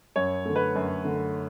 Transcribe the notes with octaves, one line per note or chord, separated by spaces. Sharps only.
F#2 C#5
D3 A3
B4
F#2
D3 A3